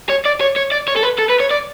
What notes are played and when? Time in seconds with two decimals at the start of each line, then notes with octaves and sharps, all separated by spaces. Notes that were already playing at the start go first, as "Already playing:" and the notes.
0.09 C#5
0.25 D5
0.41 C#5
0.56 C#5
0.72 D5
0.88 C#5
0.97 A4
1.03 B4
1.19 A4
1.30 B4
1.40 C#5
1.51 D5